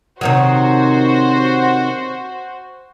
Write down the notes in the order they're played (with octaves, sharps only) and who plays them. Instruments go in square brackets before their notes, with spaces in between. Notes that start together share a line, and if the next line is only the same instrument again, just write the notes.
[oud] C3 D#3 F#3 [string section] F#4 C5